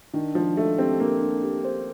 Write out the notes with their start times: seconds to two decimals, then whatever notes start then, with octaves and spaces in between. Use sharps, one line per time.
0.14 D#3 D4
0.35 F3 D4
0.57 A3 D4
0.78 C4 G4
1.00 A#3 D4
1.22 D4
1.43 G4
1.65 C5